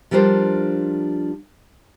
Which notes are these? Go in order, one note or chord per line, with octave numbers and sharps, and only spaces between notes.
F3 G3 D4 A#4 C5